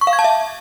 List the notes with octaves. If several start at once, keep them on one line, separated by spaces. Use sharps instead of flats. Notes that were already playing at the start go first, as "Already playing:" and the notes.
C#6
F5
G#6
A5
E5